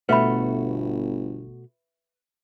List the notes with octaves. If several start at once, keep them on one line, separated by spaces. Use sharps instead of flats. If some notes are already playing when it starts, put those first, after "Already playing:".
G1 B2 A3 F#4 B4 E5 B5